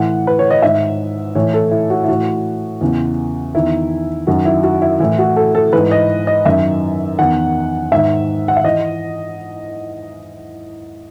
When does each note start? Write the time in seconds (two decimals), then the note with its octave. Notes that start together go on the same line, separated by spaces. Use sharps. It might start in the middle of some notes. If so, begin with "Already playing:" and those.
Already playing: A2 E3 F#5
0.27 B4
0.39 C#5
0.51 D#5
0.62 G#2 D#3 E5
1.35 A2 E3 C#5
1.54 A4
1.71 E4
1.90 F#4
2.04 E4
2.08 A2 E3 F#4
2.81 E2 C#3 E3
3.55 E2 D#3 E4
4.27 F#2 D#3 F#4
4.45 E4
4.63 F#4
4.82 E4
5.00 A2 E3 E4
5.19 F#4
5.36 A4
5.55 A4
5.73 G#2 E3 B4
5.91 D#5
6.27 D#5
6.45 F#2 D#3 E5
7.19 E2 D#3 F#5
7.91 G#2 D#3 E5
8.48 F#5
8.57 E5
8.64 E3 D#5